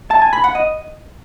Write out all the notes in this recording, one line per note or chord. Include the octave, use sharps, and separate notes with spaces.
A5
G#5
B5
F#5
D#5